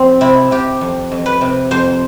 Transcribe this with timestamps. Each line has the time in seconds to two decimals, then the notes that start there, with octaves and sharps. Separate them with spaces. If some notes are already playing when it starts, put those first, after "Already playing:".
Already playing: F2 C4
0.21 C3 E4
0.51 C3 G4
0.81 F2
1.12 F2
1.26 B4
1.41 C3
1.71 F2 C5